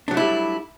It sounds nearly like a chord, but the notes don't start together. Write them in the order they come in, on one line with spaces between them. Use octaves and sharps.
D4 F#3 A3 E4 G3